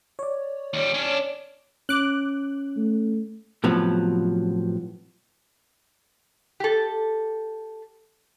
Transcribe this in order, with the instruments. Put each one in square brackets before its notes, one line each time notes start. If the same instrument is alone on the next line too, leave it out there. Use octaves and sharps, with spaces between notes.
[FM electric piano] C#5 D5
[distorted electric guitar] D#2 G3
C#4 D4
[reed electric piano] C#4 [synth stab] D6 F#6
[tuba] A3
[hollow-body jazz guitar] A2 C3 F3 F#3 B3
[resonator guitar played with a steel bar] G4 A4